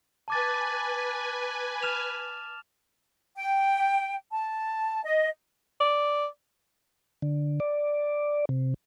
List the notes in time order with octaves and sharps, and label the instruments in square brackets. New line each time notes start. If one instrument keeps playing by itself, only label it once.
[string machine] B4 G#5 [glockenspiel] A5 D6 A6
[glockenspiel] F6 E7 F7
[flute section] G5
A5
D#5
[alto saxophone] D5
[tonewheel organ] D3
D5
C3